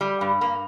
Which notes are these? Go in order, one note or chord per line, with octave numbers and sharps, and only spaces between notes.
G3
G2
G2 A#3